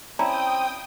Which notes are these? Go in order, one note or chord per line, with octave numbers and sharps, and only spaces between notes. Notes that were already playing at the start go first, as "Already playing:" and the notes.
C4 C#4 E4 D5 G5 A5 A#5 D#6